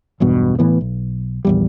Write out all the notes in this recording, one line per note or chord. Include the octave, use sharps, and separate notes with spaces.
B1 E2 G2 B2
A2 E3 B3
B1
A#1 E2 G3